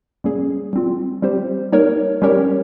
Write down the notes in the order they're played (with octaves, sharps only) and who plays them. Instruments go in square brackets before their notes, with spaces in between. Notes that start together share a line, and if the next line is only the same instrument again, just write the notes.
[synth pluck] G3 A#3 C#4 G#4
G3 C4 F4
G3 C4 G4 C5
G3 A#3 D#4 A#4 C#5
G3 C#4 G4 A#4 C#5